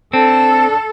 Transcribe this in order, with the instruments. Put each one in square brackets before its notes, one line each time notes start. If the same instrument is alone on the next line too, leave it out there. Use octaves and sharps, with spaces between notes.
[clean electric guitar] C4 [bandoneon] D4 [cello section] A4